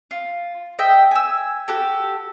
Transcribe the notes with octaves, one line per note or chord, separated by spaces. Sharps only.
F4
D#5 E5 G5
G#5 E6
F#4 G4 A4